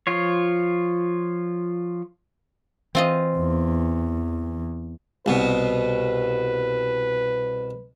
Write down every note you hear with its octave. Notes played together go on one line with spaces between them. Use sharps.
F3 F4 C#5
E3 C4 F4 D#5
E2
C2 B2 B4